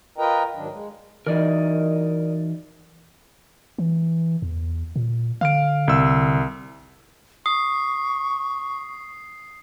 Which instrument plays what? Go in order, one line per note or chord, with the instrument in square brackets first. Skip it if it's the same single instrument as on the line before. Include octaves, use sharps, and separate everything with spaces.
[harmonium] F4 A#4 B4 D#5 G5 A#5
G#2 D#3 F#3 D4
G#3
[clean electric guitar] E3 F#3 D#4 [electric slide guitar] A#4 D5 D#5
[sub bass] E3
E2
A#2
[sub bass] D3 [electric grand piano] F5 F6 D7
[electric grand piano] C2 E6
[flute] C#6 [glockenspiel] D#6 [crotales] C7